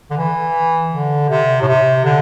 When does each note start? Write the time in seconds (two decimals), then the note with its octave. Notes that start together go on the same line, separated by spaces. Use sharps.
0.10 D3
0.17 E3
0.92 D3
1.29 C3
1.61 A2
1.67 C3
2.04 D3